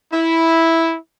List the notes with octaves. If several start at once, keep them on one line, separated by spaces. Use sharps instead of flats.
E4